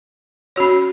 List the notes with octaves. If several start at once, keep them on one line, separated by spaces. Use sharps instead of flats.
C#4 F#4 C#5